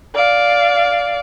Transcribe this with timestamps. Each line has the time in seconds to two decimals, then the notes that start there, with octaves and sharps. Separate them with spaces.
0.15 D5 F5